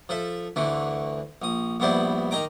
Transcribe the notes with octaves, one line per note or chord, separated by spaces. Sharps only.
F3 A4 E5
D2 D3 E3 A3
A#1 D#6
A#1 G2 B3 E4 C5 D5
D#3 D#5 G5 A#5 D6